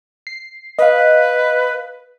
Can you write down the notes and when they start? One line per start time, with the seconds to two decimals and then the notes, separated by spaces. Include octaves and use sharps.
0.27 C7
0.79 B4 D#5 F5